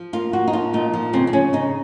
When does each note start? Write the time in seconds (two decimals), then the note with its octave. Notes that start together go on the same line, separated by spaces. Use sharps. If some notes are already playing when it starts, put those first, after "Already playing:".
Already playing: F3
0.13 A#3 F4
0.33 A#3 F#4
0.48 D#4
0.53 F3 F4
0.73 A#2 D#4
0.93 F3
1.13 C#3 C4
1.27 C4
1.33 C#3 C#4
1.53 C#3 D#4